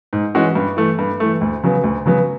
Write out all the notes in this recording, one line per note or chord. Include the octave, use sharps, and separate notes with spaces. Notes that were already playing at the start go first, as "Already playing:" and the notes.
G#2
E3 G#3 C#4 F#4
G2
E3 A3
G2
E3 A3
D2
C#3 F#3 B3
D2
C#3 F#3 B3